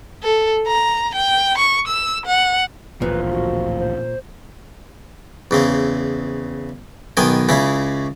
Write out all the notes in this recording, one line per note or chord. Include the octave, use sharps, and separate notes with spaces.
A4
A#5
G5
C#6
E6
F#5
D1 A1 A#2 F3 B4
F#4
C5
E2 C#3 C4
B1 D#3 B3 G5 G#5
C#2 C#3 C#4 E4